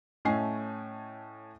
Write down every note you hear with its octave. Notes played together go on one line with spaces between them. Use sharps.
A2 A3 C#4 D#5 G#5 C7